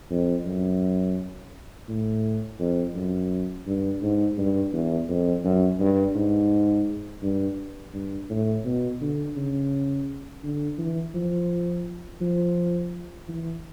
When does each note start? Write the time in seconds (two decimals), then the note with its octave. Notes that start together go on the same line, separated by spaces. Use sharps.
0.11 F2
0.45 F#2
1.88 A2
2.59 F2
2.95 F#2
3.66 G2
4.02 G#2
4.38 G2
4.73 E2
5.09 F2
5.44 F#2
5.80 G2
6.15 G#2
7.22 G2
7.93 G2
8.29 A2
8.65 B2
9.01 D3
9.36 C#3
10.43 D3
10.78 E3
11.14 F3
12.21 F3
13.28 E3